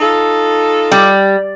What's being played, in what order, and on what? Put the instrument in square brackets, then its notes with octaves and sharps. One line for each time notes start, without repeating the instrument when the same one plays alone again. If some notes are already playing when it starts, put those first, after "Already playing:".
[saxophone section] D#4 F4 A4
[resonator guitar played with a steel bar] G3